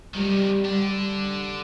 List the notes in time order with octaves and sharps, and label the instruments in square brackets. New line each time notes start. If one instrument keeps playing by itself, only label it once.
[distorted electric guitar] C3 D#3 [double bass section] G3
[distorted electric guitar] D3 D4